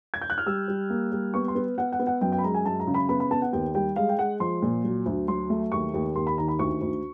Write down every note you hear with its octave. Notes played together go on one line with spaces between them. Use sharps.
G#6
G6
F#6
F6
G3 E6
G3
A#3
G3
B3 C#6
C6
B3
B3 F#5
F#5
B3
F#5
F#2 G5
G5
B5
G#3 A#5
G#5
F#2 A5
A#5
C#3
B5
B3 B5
B5
B3 A5
F#5
D#2 G5
G3 G5
G#3 F5
G5
G#3 F#5
F3 C6
A#2
F#3
D2
F#3 C6
A3
D#2 C#6
D#2
D#2 C6
B5
D#3 A#5
B5
D2 C#6
D2